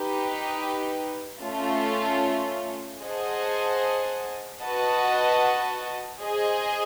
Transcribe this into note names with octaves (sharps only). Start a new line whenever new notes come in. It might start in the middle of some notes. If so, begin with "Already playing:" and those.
Already playing: D#4 G4 B4
A3 C#4 F4
G#4 C5 D#5 F#5 A5
F#4 B4 D#5 F#5 A5
G#4 C5 D#5